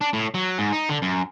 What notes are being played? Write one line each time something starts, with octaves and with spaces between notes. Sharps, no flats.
D4
A2
F#3
G#2
D#4
D3
F#2